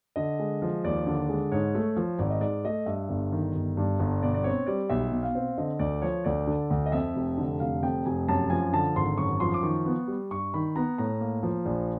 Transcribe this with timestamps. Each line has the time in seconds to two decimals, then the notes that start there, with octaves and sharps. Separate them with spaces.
0.16 D3 D#5
0.39 G#3
0.62 F3
0.85 D#2 D5
1.07 D3
1.29 G#3
1.52 G#2 C#5
1.75 A3
1.96 F3
2.19 G#1 D5
2.30 D#5
2.41 G#2 D5
2.65 A3 D#5
2.86 G2 E5
3.09 G1
3.32 D#3
3.55 G1
3.77 G2
3.99 G1
4.22 B2 D5
4.34 D5
4.44 C4 C#5
4.67 G3 D5
4.89 B1 E5
5.12 B2
5.23 F5
5.35 C4
5.58 D3 D#5
5.79 D2 D5
6.02 F3 C#5
6.24 D2 D5
6.47 D3
6.70 D2
6.86 D#5
6.92 F2 E5
7.16 F1
7.37 D3
7.60 F1 F5
7.83 F2 G5
8.05 F1 G#5
8.29 F#2 A5
8.50 F3 G#5
8.73 D3 A5
8.96 G#1 C6
9.18 F#2 C#6
9.40 F3 C6
9.54 D6
9.63 D#3 C#6
9.86 B3
10.08 G3
10.31 G2 C#6
10.54 D#3 B5
10.76 B3 A#5
10.98 A2 A#5
11.20 A#3
11.43 F3
11.65 A#1